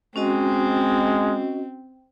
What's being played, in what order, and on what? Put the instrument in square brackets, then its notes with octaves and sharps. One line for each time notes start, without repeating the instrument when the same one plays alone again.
[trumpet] G#3 [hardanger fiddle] C4 [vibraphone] C#4 F#4 D#5